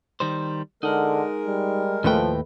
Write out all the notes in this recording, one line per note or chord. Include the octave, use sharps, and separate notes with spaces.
D#3 G3 C5
D3 G#3 D#4 A#4 F#5
G3
D#2 A2 F3 A3 B4 G5